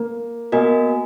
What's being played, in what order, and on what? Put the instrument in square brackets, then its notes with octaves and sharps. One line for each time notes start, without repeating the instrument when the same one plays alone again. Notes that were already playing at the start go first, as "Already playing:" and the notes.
Already playing: [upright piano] A#3
[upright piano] A#3 [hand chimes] B3 F#4 A#4 D#5 G#5